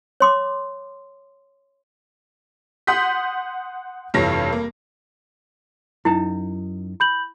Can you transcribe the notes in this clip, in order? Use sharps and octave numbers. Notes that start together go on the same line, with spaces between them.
C#5 C6 D6
F#5 C6 D#6 G6 B6
F1 G2 E3 C#5 A#6
A#3
F#2 D#4 E4 A5
B5 G6 F#7